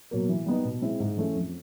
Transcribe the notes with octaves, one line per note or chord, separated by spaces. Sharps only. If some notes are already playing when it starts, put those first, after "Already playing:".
B2 F#3 A#3
E3
G3 B3 D#4
B2
G#3 C4 E4
G#2
E3 A3 C#4
F2